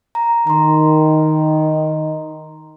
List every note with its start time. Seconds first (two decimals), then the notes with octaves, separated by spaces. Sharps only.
0.15 A#5
0.47 D#3 A#5 C6